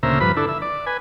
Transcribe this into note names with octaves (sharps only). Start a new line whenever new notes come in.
D2 A#2 C#3 C5 E5 A#5
G2 F3 B4 B5
D3 D4 E4 A4
E5
D5
B4 G#5